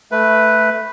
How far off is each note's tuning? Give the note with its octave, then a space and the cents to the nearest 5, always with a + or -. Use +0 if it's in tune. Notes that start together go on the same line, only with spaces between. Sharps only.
A3 +0 B4 +0